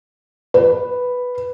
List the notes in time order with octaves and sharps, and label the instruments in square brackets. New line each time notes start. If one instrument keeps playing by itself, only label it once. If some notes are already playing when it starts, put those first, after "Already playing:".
[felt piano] B4